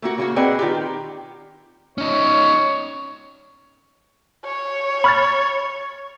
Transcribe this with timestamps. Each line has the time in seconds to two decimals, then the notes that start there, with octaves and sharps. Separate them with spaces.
0.02 A3 A#3 F#4
0.18 C#3 A#3 F#4
0.36 C4 G#4 B4 D5 D#5 F#5
0.59 D#3 F4 G4
1.98 C#4 D#4 C#5
4.45 C#5
5.04 B5 F6 A6